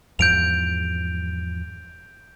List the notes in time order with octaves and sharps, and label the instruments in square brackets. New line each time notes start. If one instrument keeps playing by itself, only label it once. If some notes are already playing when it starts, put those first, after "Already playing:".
[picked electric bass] E2 G#2 F3 [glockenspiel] G6 D7 F7